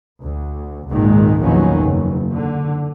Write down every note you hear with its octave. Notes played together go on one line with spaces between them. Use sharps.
D2
G#1 C#2 A#2 D#3 G#3
A#1 E2 D#3 F3 F#3 C#4
F#1
D3